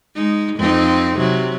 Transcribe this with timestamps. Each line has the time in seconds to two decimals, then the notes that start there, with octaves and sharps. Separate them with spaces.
0.15 G#3 D#4
0.56 F2 C4 D#4
1.17 C3 F#3